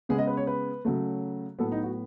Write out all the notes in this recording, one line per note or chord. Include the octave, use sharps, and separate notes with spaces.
C#3 G#3 B3 G#4
D#5
B4
C#5
B4
C#3 F#3 A3
A2 F#3 B3 A4
D#4
F#4